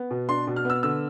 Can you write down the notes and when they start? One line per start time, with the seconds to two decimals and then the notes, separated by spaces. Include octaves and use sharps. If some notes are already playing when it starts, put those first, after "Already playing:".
Already playing: B3
0.11 B2
0.29 D4 C6
0.47 B2
0.56 F6
0.65 B3 E6
0.83 D3 E6